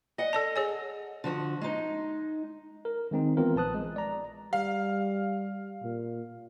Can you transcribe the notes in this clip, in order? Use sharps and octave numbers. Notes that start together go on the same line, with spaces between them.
D#5 F#5
A4 D5 A5
G#4 C#5 G#5
D3 F3 F#4
G#3 D#4
A#4
D#3 G#3 C4 D#4
E3 B3 C4 F4 A#4
A#1 B4 A5 D#6 F#6
G#3
D5 A#5
G3 F5
A#2